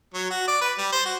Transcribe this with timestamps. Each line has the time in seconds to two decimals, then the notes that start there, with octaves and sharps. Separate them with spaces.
0.14 F#3
0.30 F#4
0.48 D5
0.61 B4
0.78 G3
0.92 C5
1.06 F#4